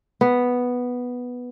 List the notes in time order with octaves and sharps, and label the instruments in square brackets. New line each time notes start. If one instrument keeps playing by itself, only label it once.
[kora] B3